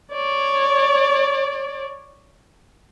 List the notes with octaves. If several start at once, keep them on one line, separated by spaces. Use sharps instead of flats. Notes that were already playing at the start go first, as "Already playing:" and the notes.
C#5 D5